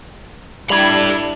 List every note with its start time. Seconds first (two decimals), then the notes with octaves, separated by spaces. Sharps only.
0.70 G3 D4 E4 A4 B5 G#6 F7